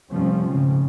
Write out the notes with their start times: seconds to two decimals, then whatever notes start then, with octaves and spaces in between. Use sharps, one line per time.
0.10 F1 C3 F3 G3 C4 C#4
0.50 G#2 C#3 F3